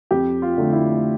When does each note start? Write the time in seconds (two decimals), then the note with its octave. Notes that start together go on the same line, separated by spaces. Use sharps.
0.11 F2 G4
0.42 F4
0.57 D3 A3
0.73 E4